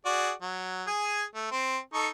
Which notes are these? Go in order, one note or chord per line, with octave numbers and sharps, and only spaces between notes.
F#4 G#4 D5
F#3
G#4 G#5
A3
C4 C6
D#4 A4 C#6